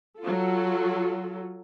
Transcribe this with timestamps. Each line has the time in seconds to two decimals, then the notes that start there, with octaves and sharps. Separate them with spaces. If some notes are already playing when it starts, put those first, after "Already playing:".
0.19 F#3 F4 A4